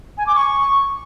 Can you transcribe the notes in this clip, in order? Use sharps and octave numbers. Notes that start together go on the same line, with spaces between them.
G#5
D6
C#6